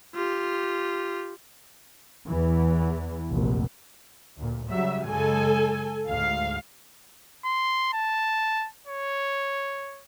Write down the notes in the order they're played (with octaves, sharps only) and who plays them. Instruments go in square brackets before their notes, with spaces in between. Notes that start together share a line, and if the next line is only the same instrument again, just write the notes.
[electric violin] F4 G4
[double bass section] E2 E3
F1 A#1
D2 A#2
[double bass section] C#3 F#3 G3 [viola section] E5
[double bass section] F#2 C#3 G#3 [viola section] A4 G#5
[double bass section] D2 G#2 [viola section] F5
[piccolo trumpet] C6
A5
C#5